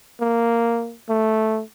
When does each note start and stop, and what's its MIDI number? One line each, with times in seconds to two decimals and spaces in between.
0.20 0.95 58
1.09 1.62 57